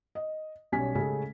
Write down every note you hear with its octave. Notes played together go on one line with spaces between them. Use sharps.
D#5
B1 G3 C#4 G#5 B6
A2 C#3 G#3 A3 C#4 G4